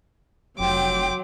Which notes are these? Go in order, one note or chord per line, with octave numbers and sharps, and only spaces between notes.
F1 F#3 G5 C6 D6